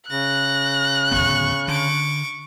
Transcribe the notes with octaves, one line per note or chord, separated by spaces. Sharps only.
C#3 F#6 A#6
D1 G1 B3 C#6
D3 C#6 D6